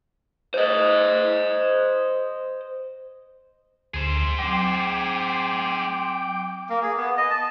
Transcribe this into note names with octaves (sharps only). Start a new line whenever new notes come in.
C5 D#5
D2 G#4 C5
F#3 C4 G5 D6
A#3
G#4
B3
D#5
A5